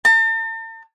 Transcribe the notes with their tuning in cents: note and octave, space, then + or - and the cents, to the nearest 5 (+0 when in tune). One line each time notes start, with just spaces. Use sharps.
A5 +45